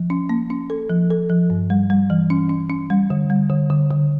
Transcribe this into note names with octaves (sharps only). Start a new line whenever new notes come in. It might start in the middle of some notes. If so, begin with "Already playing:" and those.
Already playing: F3
C#4
A#3
C#4
A4
F3
A4
F3
G2
G3
G3
E3
C#4
C#4
C#4
G3
D3
G3
D3
D3
D3